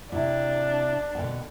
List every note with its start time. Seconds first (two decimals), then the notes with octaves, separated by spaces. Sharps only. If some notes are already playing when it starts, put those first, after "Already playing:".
0.12 C3 D4 E4
1.15 B2 D3 G5